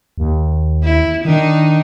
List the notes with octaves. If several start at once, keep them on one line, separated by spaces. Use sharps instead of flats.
D#2
E4
D#3 D4 D#4